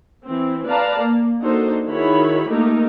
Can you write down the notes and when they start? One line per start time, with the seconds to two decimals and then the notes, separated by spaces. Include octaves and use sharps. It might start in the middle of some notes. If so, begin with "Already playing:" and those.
0.24 E3 C4
0.67 B4 D5 F5 A5 A#5
0.99 A#3
1.41 A#3 D4 D#4 F#4 A4 C5
1.87 D#3 E4 F#4 G#4 C#5 B5
2.49 A3 A#3 D#4 G4 A4 A#4